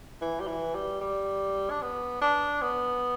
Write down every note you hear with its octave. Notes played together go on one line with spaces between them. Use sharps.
E3
G3
E3
G3
G3
D4
B3
D4
B3